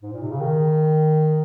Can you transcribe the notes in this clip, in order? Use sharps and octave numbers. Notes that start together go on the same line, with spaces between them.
G#2
A#2
C3
C#3
D#3